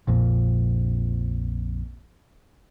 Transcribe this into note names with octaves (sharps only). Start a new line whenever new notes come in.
A#1 F2 A#2